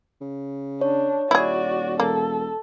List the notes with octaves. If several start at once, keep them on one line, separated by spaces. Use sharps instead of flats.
C#3
D4 C#5
D#1 E4 F#4 G#4 D5
E1 A#3 A4